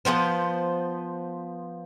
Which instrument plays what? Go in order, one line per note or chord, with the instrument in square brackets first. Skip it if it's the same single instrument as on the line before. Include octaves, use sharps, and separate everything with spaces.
[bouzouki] F3 G#3 B3 C5